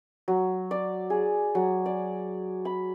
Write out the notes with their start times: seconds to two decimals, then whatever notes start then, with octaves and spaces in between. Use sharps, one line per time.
0.28 F#3
0.71 D5
1.10 G#4
1.55 F#3
1.86 D5
2.65 B5